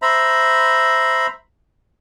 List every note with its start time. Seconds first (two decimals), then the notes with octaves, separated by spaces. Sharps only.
0.02 C5 E5 A#5 B5